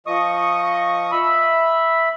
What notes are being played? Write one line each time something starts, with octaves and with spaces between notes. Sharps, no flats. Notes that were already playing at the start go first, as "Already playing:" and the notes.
F3 D#5 C#6 D#6
E5 B5